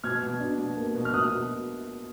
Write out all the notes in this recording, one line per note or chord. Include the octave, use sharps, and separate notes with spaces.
B2 F6 G#6
B2
D4
B2
A#3
B2
F6
B2 D#6 F#6
B2